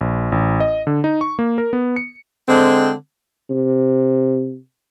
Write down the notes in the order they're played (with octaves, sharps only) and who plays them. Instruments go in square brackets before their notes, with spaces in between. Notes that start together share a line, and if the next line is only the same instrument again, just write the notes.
[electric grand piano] A#1
A1
D#5
D3
D#4
C#6
A#3
A#4
B3
C#7
[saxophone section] D3 G#3 C4
[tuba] C3